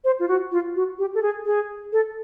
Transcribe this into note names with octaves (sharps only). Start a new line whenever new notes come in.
C5
F4
F#4
F4
F#4
G4
A4
G#4
G#4
A4